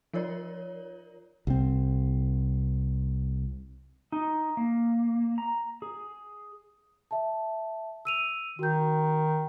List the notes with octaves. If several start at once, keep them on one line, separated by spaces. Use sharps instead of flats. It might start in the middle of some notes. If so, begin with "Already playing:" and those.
F3 F4 A#4 C#5 D5
C2 C4
D#4
A#3
A#5
G#4
E5 A5
E6 D#7 F7
D#3 F#4 G6